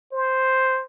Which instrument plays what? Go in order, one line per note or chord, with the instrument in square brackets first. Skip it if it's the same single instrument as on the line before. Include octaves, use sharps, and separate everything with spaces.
[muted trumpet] C5